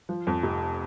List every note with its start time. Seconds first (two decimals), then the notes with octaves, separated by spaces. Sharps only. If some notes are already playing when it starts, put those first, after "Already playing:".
0.09 F3
0.27 F2
0.43 F1